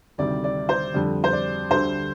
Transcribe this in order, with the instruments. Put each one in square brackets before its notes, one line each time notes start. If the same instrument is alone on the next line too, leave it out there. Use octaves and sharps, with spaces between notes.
[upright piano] D2 C3 D#3 G3 D5
D5
C5
F2 D3 G3
C5
D5
D2 D3 G3 C5